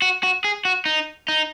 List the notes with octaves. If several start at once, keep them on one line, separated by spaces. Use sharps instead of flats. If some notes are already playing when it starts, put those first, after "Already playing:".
F#4
F#4
G#4
F#4
D#4
D#4